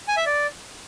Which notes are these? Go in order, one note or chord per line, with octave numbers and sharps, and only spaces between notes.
G#5
E5
D5